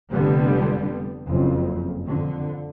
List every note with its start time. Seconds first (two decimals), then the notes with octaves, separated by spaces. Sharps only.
0.10 F1 D3 G3 B3
1.28 F#1 F2
2.05 F2 D3